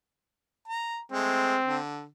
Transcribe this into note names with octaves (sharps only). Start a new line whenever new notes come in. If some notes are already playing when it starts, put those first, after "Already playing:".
A#5
G#3 A3 C4
D3